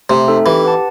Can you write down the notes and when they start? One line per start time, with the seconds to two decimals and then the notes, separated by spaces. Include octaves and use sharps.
0.09 C3 A3
0.28 C4 D#4 A4 E5
0.46 E3 G4
0.64 B4 F#5 A5